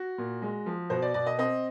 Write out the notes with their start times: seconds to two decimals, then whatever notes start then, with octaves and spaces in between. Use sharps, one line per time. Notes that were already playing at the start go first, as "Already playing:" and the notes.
Already playing: F#4
0.18 A#2
0.42 G#3
0.66 F3
0.90 B2 C5
1.02 D5
1.14 B2 D5
1.26 D#5
1.38 C4 D#5